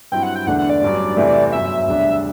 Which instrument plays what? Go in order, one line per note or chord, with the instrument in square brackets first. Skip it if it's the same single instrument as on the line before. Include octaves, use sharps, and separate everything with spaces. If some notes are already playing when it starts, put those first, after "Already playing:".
[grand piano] G2 F#3 C4 E4 [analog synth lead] G5
[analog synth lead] F#5
G5
[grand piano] E1 E2 D3 A3 D4 [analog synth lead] F#5
[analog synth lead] F#5
D5
[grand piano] A1 G2 F#3
E2 C3 E3 A3
[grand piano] G1 F#2 F#3 [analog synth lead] E5
[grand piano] E1 D2 C3 G3 D4